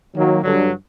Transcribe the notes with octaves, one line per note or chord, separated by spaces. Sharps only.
D#3 F#3 A#3
G2 D3 F#3